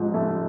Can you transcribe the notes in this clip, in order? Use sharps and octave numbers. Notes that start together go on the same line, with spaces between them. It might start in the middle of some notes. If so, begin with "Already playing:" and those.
Already playing: A1 G#2 F3
A3